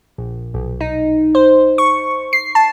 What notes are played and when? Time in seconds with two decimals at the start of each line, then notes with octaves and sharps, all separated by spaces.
0.18 A#1
0.54 B1
0.81 D#4
1.35 C5
1.78 C#6
2.33 C7
2.55 A5